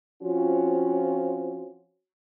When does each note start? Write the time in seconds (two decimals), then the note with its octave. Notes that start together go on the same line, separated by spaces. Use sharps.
0.23 F3 C4 C#4 F4 F#4